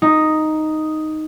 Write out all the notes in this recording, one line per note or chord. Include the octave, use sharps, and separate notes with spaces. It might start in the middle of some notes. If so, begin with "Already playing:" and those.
D#4